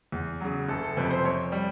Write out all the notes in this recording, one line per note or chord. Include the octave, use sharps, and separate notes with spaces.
E2
C#3 F#3
F#1 A4
A4
F2 C3 B4
C5
F2 C#5
G3